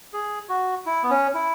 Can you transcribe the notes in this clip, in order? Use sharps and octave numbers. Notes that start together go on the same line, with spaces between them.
G#4
F#4
E4
B3
C#4
E4